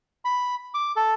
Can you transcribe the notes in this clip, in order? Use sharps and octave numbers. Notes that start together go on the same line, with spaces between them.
B5
D6
A4